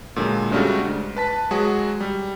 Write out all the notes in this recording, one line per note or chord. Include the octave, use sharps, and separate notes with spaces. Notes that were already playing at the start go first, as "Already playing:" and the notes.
A#2 D3 F#3 G#3
G#2 C#3 G3 A3 D4 F#4
G#2
B4 A5 B6
F#3 G#3 F#4 G#4
G3